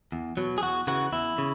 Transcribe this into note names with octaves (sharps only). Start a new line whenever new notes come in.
E2
B2 F#3
G#4
E2 F#4
C#3 E3 F#4
E2 E4
C#3